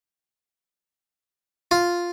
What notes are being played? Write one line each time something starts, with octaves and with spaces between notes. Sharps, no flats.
F4